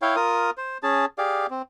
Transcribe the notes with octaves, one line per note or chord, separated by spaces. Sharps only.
E4 C#5 F5 G5
F4 A#4 D#6
C5
C#4 G#4 A5
G4 G#4 D5 F5
C4